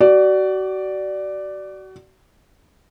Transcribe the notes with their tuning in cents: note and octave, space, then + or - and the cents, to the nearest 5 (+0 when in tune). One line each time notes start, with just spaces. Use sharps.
F#4 +35 D5 +0